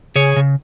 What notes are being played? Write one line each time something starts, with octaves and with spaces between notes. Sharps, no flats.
C#3 G#4 C#5
C#3